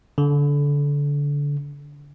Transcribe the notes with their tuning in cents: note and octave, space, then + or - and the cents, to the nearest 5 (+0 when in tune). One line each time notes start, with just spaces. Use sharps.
D3 -25